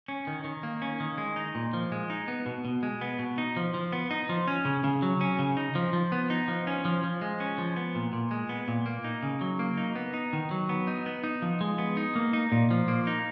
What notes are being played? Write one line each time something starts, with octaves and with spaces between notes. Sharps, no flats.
C#4
D#3
D#3
A#3
C#4
D#3
G#3
D#4
A#2
F3
G#3
D#4
B3
B2
B2
G#3
B3
B2
D#4
F3
F3
B3
D#4
F3
C#4
C#3
C#3
F#3
C#4
C#3
D#4
F3
F3
B3
D#4
F3
C#4
F3
F3
G#3
C#4
F3
B3
A#2
A#2
G#3
B3
A#2
A#3
D#4
C#3
F#3
A#3
D#4
B3
D#4
D#3
F#3
B3
D#4
B3
D#4
F3
G#3
B3
D#4
A#3
D#4
A#2
F3
A#3
D#4